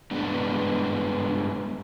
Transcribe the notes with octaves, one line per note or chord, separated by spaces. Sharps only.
G2 G#3 B3 D4